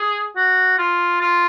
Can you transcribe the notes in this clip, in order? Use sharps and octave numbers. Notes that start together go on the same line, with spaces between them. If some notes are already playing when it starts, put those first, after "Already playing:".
Already playing: G#4
F#4
F4
F4